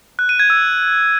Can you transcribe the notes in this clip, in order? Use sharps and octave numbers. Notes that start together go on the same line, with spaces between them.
F#6
D#7
G#6
E6